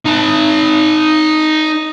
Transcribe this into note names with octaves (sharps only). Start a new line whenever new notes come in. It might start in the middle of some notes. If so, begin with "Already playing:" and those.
D#4 A5